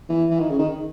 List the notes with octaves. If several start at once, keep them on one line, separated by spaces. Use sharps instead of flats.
E3
E3
D#3
C#3
D#3